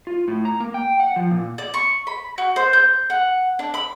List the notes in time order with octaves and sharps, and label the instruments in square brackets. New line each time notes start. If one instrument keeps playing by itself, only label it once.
[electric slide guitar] F4
A2
A#5
A#3
G5
F#5
F3
A#2
[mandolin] D5
C#6
B5
F#4
C5
G6
F#5
D4
B5